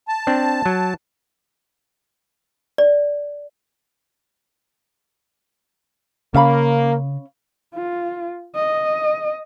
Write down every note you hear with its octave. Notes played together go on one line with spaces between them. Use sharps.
A5
C4 D4
F#3
D5
C#3 A#3 C#4 F5 B5
F4
D#5